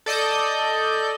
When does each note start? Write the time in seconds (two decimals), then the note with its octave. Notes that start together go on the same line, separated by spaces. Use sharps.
0.06 A4 D5 D#5 G6